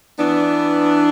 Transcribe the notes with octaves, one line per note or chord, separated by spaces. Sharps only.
E3 B3 D4